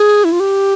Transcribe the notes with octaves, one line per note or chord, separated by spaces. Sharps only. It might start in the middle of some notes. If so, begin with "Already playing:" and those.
Already playing: G#4
E4
F4
G4